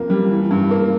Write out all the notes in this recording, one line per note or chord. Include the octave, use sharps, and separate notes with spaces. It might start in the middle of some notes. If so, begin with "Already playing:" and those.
Already playing: F2 A#3
G3
E3
G2
A#3